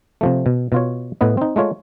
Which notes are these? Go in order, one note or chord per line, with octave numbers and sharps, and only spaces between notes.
C3 F3 A3
B2
B2 F4 C#5
A2 B3 B4 D#5
C4 D#4
G#3 A3 F4 C#5